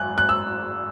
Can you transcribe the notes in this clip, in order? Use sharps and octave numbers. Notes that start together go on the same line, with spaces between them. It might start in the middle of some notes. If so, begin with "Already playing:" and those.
Already playing: G#1 F#2 G#5 F#6
F#6
E6